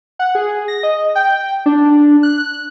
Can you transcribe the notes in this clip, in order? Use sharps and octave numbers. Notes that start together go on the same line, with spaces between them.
F#5
G#4
A#6
D#5
G5
D4
F#6